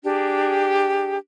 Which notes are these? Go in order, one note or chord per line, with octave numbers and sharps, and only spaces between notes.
D4 G4 G#4